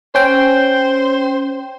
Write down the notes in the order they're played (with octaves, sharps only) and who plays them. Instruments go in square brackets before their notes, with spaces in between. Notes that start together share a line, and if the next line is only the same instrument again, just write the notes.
[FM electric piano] C#4 G5 [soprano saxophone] C5